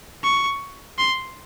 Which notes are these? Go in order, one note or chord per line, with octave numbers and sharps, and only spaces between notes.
C#6
C6